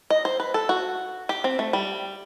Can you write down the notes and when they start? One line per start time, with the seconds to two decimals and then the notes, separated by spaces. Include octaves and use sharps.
0.10 D#5
0.25 C5
0.40 B4
0.54 A4
0.69 F#4
1.29 G4
1.44 C4
1.59 A3
1.73 G3